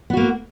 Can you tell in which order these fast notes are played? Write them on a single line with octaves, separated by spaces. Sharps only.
B3 F#4 A#3